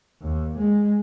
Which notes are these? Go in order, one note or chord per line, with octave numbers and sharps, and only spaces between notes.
D#2
G#3